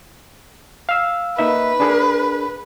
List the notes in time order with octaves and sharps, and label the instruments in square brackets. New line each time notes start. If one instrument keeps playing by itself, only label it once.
[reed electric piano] F5 E6
[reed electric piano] A#3 D#4 E5 [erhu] B4
[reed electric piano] D4 G#4 A#4